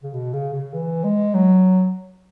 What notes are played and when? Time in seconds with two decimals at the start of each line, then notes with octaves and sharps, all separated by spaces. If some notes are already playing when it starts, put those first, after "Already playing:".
0.03 C#3
0.14 B2
0.33 C#3
0.53 C#3
0.74 E3
1.04 G#3
1.35 F#3